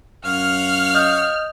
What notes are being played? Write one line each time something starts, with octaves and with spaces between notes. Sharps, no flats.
F#2 C#5 F5 F#5 F6
D#5 D#6 G6